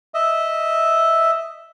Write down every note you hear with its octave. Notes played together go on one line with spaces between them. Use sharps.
D#5 E5